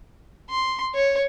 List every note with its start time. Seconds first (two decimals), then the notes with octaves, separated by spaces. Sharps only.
0.49 C6
0.94 C#5